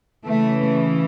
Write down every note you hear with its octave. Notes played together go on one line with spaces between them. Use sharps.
C#3 E3 A3